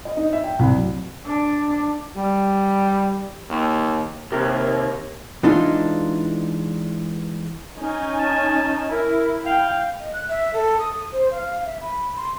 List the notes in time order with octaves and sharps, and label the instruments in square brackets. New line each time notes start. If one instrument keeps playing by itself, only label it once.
[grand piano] D#5
D#4
E5
G5
C2
F#3
[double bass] D4
[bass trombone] G3
D#2
[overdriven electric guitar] D#2 [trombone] C3 [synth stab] G4 A#4
[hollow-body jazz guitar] E3 G#3 D4 D#4 F4
[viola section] C#4 D#4 G#5
[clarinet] A5
[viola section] E4 [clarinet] A#4
[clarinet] F5 [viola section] G5
[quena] D#5
F#6
E5
A4
D#6
C5
F5
E5
B5
C6